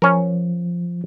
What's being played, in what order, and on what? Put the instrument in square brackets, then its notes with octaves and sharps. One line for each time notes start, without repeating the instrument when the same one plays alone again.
[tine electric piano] F3 [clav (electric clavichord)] C#4 A#4